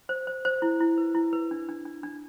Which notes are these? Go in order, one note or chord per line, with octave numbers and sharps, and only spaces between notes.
C5
C5
C5
E4
E4
B4
E4
B4
D4
D4
D4
D4